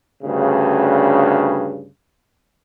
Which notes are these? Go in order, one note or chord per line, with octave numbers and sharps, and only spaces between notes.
D2 G2 C#3